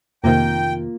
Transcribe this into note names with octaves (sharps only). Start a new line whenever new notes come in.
F2 C3 D#3 A#3 F4 G5